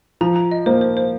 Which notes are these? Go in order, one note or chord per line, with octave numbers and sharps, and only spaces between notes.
F3 A#5
A#5
D#5
A#3 C5
C5
C5